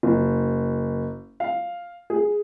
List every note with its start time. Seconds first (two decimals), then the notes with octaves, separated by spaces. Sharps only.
0.03 F#1
1.40 F5
2.10 G#4